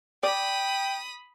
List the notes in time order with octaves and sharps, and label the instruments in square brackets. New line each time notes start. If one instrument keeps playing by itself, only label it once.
[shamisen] D5 [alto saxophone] G5 [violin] B5 D#6